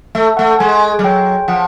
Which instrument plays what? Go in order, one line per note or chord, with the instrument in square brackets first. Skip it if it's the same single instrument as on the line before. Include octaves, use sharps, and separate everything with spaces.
[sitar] A3 [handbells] E5
[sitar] A3 [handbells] F#5
[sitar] G#3 [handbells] G#5
[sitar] G3
[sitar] F#3 [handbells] G5
[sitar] F3 [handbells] F#5